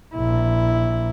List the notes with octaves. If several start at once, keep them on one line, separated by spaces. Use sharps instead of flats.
A#1 E4